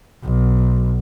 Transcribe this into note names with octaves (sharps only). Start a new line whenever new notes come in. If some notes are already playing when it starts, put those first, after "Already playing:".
B1